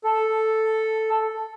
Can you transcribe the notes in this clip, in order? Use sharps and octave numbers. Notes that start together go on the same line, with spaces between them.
A4